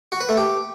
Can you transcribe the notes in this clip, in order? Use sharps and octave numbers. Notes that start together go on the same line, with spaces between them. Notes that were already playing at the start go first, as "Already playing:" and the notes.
F#4
B4
A3
G4